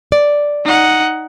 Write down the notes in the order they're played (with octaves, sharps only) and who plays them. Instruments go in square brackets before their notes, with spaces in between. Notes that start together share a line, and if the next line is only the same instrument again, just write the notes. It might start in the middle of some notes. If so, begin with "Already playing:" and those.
[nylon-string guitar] D5
[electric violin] D#4 F#5